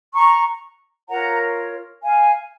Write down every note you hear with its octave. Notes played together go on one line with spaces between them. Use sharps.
A#5 C#6
F4 A#4 C#5 F#5 A#5
F5 G#5